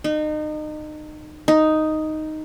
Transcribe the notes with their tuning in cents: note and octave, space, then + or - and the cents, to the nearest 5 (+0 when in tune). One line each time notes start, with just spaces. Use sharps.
D#4 -30
D#4 +0